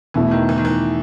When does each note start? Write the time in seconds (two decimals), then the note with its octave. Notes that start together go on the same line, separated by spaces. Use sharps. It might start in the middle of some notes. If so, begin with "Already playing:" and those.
0.14 E2 B2 E3 A3 E4
0.31 D#3
0.49 E3
0.58 D#3
0.65 E3